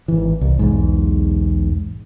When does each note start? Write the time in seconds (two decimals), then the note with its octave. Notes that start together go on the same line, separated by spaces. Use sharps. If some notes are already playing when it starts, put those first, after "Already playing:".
0.08 G#1 E3
0.41 C2
0.59 B1 E2 G#2